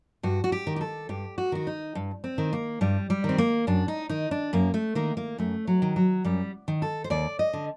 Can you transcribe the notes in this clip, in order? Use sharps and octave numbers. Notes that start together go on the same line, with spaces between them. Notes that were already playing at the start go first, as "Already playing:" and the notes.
G2 F#4
F#4
G4
D#3
G4
A4
G2 G4
F#4
D#3 F#4
D#4
G2
C4
D#3
A#3
G2 G3
G3
D#3
C4
A#3
F#2 D4
D#4
D#3 D#4
D4
F#2 A#3
A3
D#3 A#3
A#3
F#2 A3
F#3
D#3
F#3
F#2 G3
D#3
A4
C5
D#2 D5
D#5
D3